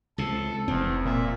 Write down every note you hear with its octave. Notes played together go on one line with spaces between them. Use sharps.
C#2 C3 A4
F1 E2 C4
A#2 E5